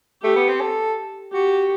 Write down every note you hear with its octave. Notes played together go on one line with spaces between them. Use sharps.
A3 G4
B3
C4
A4
F#4 G4